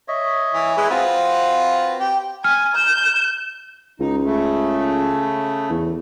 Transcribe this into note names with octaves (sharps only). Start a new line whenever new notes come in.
C#5 D#5 E5
E3
G#3 E4 G#4 B4
C4 F4 F#4 B4
G4
G#5 F6
G6 E7
C#2 D#4
C#3 A3
E2